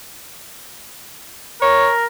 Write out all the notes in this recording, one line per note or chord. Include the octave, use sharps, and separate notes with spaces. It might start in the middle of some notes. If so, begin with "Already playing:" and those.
A#4 C#5